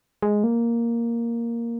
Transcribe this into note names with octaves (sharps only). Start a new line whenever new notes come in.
G#3
A#3